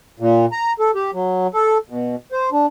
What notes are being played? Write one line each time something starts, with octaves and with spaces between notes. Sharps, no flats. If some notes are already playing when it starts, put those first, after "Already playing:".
A#2
A#5
A4
G4
F#3
A4
B2
C5
D4